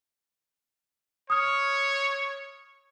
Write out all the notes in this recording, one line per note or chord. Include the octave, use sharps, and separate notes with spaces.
C#5 D#6 F6